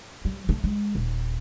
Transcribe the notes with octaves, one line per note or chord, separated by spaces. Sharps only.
G3
A3
G#3
D#1